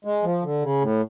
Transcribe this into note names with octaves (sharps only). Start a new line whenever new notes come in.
G#3
F3
D3
C#3
A2